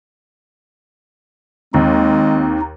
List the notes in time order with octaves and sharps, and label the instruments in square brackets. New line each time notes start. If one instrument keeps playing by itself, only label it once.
[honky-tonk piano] D#2 [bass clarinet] G#3 [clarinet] C4 [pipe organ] D#4